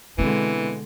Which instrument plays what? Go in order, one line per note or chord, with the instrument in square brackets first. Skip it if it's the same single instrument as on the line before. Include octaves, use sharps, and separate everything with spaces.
[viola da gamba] B2 D3 G#3 [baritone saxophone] E3 [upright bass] B3 C4